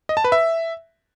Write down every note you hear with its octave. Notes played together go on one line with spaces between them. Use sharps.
D#5
A5
B4
E5